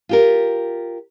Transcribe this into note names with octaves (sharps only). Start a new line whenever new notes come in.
F4 G4 A#4